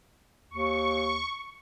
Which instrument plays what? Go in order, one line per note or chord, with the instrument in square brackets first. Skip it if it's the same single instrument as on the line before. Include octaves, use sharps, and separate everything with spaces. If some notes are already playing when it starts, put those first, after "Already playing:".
[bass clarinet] D#2 [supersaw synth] C#6